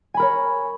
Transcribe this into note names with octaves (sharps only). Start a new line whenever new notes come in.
A#4 C#5 G#5 B5